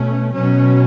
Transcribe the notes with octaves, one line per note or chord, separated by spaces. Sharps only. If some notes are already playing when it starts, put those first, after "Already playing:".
Already playing: B2 A3 C#4
B2 F#3 C#4